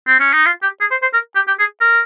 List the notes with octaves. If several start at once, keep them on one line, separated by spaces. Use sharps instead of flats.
C4
C#4
D#4
F4
G4
G#4
C5
C5
A#4
G4
G4
G#4
A#4